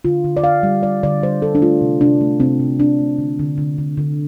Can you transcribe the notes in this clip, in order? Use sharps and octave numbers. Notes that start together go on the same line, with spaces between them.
D3 F4
D3
D5
D3 F5
G3
G3 D5
D3 D5
G3 C5
G3 A4
D4
A3 F4
C3
C3 D4
A3
C3 C4
C3
C3 D4
A3
D3
D3
D3
D3
D3